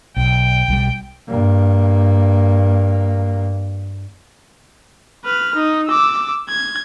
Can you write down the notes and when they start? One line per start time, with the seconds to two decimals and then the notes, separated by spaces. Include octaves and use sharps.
0.16 B1 G5
0.68 B1 E3 G3
1.28 G2 A#3
5.25 B4 F6
5.55 D#4
5.88 D6 E6
6.49 G#6